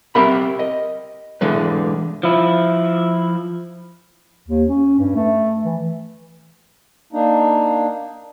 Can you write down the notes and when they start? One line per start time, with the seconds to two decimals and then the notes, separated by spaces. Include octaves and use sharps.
0.15 C4 G4 A#4 E5 B5
0.59 D#5
1.41 D3 E3 G#3 B4
2.23 F3 E4
4.48 D#2
4.68 C#4
4.99 G2
5.15 A3
5.64 E3
7.13 A#3 D4 D#4